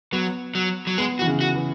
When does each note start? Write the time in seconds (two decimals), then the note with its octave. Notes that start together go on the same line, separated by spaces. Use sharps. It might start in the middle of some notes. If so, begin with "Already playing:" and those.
0.12 F#3 B3
0.55 F#3
0.87 F#3
0.98 G#3 B3
1.19 F#4
1.22 E3
1.27 C#3
1.41 F#4
1.55 E3